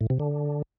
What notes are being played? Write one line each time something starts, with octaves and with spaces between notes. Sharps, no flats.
A2
C3
D3